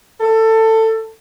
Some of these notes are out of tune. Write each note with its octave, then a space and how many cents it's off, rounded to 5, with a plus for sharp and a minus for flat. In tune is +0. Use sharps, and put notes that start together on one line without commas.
A4 +20